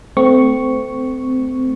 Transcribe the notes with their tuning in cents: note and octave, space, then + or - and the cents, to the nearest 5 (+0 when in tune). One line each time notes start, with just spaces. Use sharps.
A3 +0 C4 -25 C#6 +0